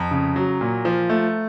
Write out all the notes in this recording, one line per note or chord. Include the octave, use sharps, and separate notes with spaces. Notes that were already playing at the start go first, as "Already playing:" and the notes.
Already playing: F2 A#5
C#3
F#3
A#2
F3
A3